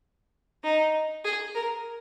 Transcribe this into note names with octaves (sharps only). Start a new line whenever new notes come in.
D#4
G#4
A#4